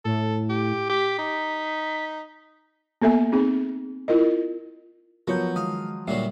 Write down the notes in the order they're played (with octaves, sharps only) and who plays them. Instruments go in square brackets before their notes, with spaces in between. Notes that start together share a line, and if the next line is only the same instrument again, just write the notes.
[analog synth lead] A2 [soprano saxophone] A4
[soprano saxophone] G4
[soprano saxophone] G4 [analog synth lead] B6
[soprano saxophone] D#4
[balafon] A#3 B3 A4 E5 G#5
C4 D#4 G#4
E4 F4 A#4 D#5
[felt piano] F3 F#3 [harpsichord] B3 [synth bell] A#4 C#5 G6
[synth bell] D#3 G#3 D#6 [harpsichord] F5
[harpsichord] A#2 D3 F#3 [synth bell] G3 E5 C7